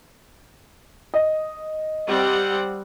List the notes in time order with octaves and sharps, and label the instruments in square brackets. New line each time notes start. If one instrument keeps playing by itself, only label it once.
[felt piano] D#5
[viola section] G3 C4 F#5